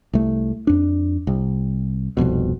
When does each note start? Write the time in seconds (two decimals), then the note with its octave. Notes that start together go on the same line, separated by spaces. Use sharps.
0.13 C2 A3
0.67 F2 D4
1.27 C2
2.17 F1 C2 F2 B2